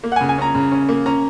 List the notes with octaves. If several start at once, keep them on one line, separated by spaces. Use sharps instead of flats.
A#3
F#5
G#5
C#3
G#5
C#4 A#5
C#3
C#4
A#3
C#4 A#5